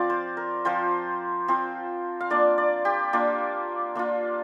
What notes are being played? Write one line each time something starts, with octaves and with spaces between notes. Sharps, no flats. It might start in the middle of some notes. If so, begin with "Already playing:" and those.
Already playing: F3 C4 F4 D5 F5
C5
A#4
F3 C4 F4 C5
F3 C4 F4
F5
A#3 D4 F4 D5
D5
G4
A#3 D4 F4
A#3 D4 F4